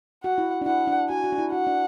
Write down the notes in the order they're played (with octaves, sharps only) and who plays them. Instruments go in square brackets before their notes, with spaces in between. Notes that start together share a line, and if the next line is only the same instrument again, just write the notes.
[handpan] F#4 [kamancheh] F#5
[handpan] E4
D4
[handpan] E4 [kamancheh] F#5
[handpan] D4
[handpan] F#4 [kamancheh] G#5
[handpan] F#4
D4
E4
[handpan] F#4 [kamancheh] F#5
[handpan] D4